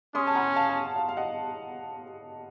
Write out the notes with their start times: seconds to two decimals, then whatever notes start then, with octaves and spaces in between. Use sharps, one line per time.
0.15 C#4 C6 D#6
0.27 A5
0.35 F#5 A#5
0.56 F5 A5
0.96 F5
1.09 F5
1.17 D#5 F#5